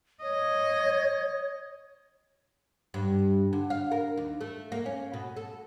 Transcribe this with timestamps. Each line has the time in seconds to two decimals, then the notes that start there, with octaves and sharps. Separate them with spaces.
0.22 C#5 D#5
2.94 G2
3.53 D3
3.70 F5
3.91 A#4
4.17 D#2
4.41 A3
4.72 A#3
4.86 C#4
5.13 B2
5.37 A4